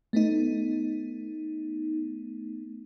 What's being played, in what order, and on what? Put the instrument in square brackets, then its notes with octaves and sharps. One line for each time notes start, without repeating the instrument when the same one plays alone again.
[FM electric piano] A3 B3 D#4